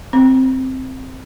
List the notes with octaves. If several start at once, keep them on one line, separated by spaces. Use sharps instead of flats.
C4